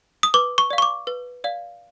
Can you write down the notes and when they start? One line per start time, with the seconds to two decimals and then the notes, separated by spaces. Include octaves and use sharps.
0.23 D#6
0.34 B4 D6
0.58 C#6
0.70 D5 F5
0.78 C#6
0.82 D6
1.07 B4
1.44 D5 F5